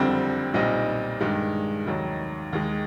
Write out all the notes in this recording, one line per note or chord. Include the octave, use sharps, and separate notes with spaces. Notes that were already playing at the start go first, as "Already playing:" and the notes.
Already playing: F#1 F2 D3 G3 C4
B1 A#2 G3 C4 D#4
G2 D#3 G#3
F1 D#2 D#3 F#3
D#2 D#3 G#3